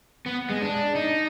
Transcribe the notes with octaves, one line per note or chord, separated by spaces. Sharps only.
B3
G#3
D4
D#4